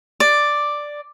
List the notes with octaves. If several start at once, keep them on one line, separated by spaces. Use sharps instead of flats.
D5